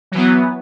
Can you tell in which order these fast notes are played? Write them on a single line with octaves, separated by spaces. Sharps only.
F#3 E3 B3